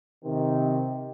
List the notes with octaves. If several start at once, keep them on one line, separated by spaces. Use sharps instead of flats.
C3 D#3